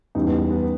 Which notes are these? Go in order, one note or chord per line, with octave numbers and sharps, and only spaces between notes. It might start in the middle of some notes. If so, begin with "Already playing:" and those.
E2 C#3 G3 D#4
B3
B3
B3